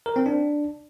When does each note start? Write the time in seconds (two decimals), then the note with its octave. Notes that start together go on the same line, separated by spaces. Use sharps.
0.06 A#4
0.16 C4
0.26 D4